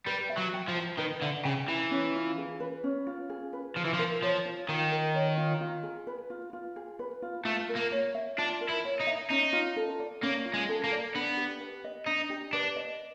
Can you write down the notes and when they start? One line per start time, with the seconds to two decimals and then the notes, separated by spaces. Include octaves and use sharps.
0.07 G3 B4
0.29 E5
0.38 F#3
0.53 G5
0.69 F3
0.75 A#5
0.99 D#3 B4
1.22 D3 E5
1.45 C#3 G5
1.68 E3 A#5
1.91 C#4
2.15 F4
2.38 G#4
2.60 B4
2.84 C#4
3.07 F4
3.30 G#4
3.53 B4
3.76 F3 F4
3.85 E3
3.94 F3
3.99 A#4
4.22 F3 C#5
4.45 F4
4.68 D#3 F4
4.91 A#4
5.15 C#5
5.37 F4
5.61 F4
5.83 G#4
6.07 B4
6.30 F4
6.53 F4
6.76 G#4
6.99 B4
7.22 F4
7.45 A3 F4
7.69 A#4
7.76 A#3
7.92 C#5
8.15 E5
8.38 D4 F4
8.61 A#4
8.69 E4
8.85 C#5
9.00 D#4
9.07 E5
9.30 C#4 D#4
9.53 F4
9.76 A4
10.00 D5
10.23 A#3 C#4
10.45 F4
10.53 G#3
10.69 A4
10.84 A#3
10.92 D5
11.15 B3 D4
11.37 G4
11.61 B4
11.84 D#5
12.07 D4 D#4
12.30 G4
12.53 D4 B4
12.76 D#5